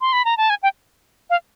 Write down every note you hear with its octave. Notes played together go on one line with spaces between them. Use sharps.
C6
B5
A#5
A5
G#5
G5
F5